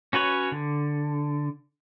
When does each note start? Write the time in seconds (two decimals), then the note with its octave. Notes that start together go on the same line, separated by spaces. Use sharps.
0.13 C#4 F#4 B4 C#5
0.52 D3